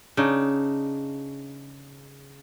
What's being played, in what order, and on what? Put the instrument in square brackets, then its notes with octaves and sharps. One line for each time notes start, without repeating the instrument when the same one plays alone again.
[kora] C#3 D4 D#4